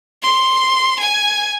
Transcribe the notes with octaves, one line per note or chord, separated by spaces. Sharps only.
C6
G#5